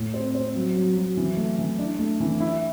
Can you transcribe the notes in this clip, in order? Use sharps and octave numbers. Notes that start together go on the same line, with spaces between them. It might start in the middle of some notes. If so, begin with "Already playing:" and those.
Already playing: A2
C4
C4
F#3
F#3
F#3
E3
A3
E3
D4
A3
E3
E4